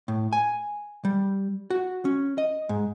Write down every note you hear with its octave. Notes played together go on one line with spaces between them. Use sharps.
A2
G#5
G3
F#4
C#4
D#5
G#2